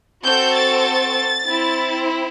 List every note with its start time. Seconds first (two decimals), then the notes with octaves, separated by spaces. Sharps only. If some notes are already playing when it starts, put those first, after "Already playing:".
0.23 C4 F#4 A4 G6
0.55 A6
1.46 C4 E4